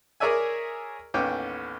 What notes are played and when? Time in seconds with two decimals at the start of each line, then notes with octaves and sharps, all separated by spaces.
0.20 G#4 A#4 C#5 D5 E5 G#5
1.14 A1 D#2 B3 C#4 G5 D6